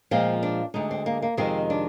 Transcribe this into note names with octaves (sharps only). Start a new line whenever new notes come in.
A#2 F3 G#3 C4
D4
D2 D3 G#3 D#4
C4
A#3
A#3
F2 C3 D#3 G#3 C4
D4